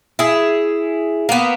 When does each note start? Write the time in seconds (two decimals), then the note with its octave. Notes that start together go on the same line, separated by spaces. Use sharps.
0.19 E4 G#4
1.29 A#3 B3